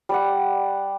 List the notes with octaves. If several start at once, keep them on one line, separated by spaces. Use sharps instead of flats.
G3 D5 F#5